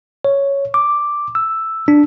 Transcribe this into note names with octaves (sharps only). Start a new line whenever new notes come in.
C#5
D6
E6
D4